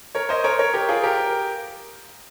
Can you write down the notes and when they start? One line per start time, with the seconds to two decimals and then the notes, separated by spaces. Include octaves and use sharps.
0.15 A#4 C#5
0.29 C5 D#5
0.44 A#4 C#5
0.59 A#4 C#5
0.74 G4 A#4
0.89 F4 G#4
1.04 G4 A#4